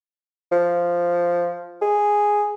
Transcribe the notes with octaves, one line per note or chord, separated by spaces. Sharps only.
F3
G#4